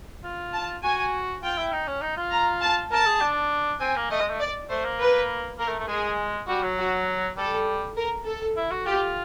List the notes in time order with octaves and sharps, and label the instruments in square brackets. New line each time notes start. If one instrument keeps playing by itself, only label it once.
[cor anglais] F4
[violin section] A5
[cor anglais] F#4 [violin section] G#5
[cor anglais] F4 [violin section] G5
[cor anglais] E4
D#4
C#4
D#4
F4
[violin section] A#5
A5
[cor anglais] A#4 [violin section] A5
[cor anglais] G#4
D4
[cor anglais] C4 [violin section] G#5
[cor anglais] A#3
[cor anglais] A3 [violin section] D#5
[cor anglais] G#3
A3
[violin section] D5
[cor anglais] A3 [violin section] C5
[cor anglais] A#3
[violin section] B4
[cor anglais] A#3 [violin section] A#4
[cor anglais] A3
A3
[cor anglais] G#3 [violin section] G#4
[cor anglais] G3 [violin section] F#4
[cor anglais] F#3
[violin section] F#4
[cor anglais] G3 [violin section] A4
[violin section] A#4
A4
[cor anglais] E4
F#4
[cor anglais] F4 [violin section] G4